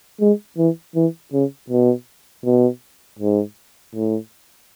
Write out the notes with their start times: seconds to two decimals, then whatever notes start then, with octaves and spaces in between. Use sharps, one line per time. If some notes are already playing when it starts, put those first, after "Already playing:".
0.21 G#3
0.58 E3
0.95 E3
1.33 C#3
1.70 B2
2.45 B2
3.19 G#2
3.94 A2